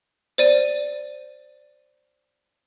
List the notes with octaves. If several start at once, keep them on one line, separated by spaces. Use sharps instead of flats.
C5 D5 D#7